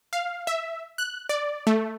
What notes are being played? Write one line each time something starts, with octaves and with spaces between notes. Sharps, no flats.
F5
E5
F#6
D5
A3